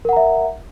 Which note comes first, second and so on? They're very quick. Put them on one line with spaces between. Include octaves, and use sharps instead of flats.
A#4 F#5 A#5 E5